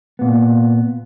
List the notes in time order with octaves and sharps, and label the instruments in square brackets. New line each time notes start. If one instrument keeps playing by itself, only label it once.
[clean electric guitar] A#2 B3